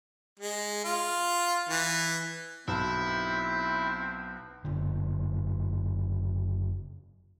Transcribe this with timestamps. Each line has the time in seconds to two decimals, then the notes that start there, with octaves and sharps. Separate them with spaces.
0.39 G#3
0.84 F4
1.69 E3
2.68 B1 C4 E4
4.65 F#1 D3